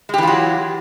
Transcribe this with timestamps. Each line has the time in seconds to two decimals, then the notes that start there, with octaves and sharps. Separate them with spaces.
0.09 G#3
0.14 G4
0.18 E3
0.23 F4
0.27 F#3